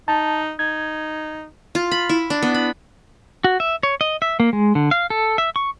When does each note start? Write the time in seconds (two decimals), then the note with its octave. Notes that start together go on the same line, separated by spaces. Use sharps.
0.08 D#4 A5
0.59 D#4 G#6
1.75 F4
1.91 B5
2.09 E4
2.30 D4
2.43 B3
2.54 B5
3.44 F#4
3.60 E5
3.83 C#5
4.01 D#5
4.22 E5
4.40 A#3
4.53 G#3
4.75 D3
4.91 F5
5.10 A4
5.38 E5
5.56 C#6